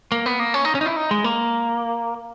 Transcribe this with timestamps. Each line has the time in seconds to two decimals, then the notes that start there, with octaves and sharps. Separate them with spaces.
0.12 A#3
0.26 B3
0.39 A#3
0.54 C#4
0.65 D#4
0.75 C#4
0.81 D#4
0.86 E4
0.96 D#4
1.11 G#3
1.24 A#3